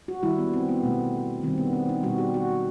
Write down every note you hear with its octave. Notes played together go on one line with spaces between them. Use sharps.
F#4
D#3 G3 E4
B3
C4
B3
B2 A3
D#3 G3 C4
B3
C4
D#4
B2 G3 F#4
G4
F#4